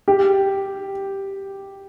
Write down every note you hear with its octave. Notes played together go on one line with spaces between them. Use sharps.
G4